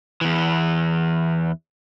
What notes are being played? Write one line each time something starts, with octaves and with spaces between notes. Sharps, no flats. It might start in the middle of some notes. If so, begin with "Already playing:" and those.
E2 E3